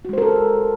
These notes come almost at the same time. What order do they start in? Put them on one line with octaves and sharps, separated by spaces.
F#4 G#3 C5 A#4 A4